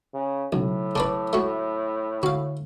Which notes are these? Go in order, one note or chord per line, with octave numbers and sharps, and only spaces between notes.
C#3
B1 A2 C#3 F#3
C#3 D4 B4 A5 D6
A3 F#4 E5
D3 F#4 F5